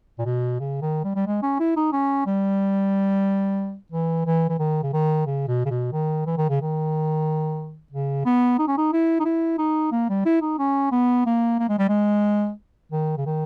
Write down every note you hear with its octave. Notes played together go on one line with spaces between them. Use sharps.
A#2
B2
C#3
D#3
G3
G3
G#3
C#4
E4
D#4
C#4
G3
E3
E3
E3
D#3
C#3
D#3
C#3
B2
C#3
B2
D#3
E3
D#3
C#3
D#3
C#3
B3
D#4
C#4
D#4
E4
D#4
E4
D#4
A#3
G3
E4
D#4
C#4
B3
A#3
A#3
G#3
G3
G#3
D#3
C#3
D#3